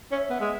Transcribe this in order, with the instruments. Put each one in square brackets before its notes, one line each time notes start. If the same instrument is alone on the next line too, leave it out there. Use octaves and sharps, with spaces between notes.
[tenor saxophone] C#4 [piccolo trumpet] E5
[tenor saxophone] B3
G#3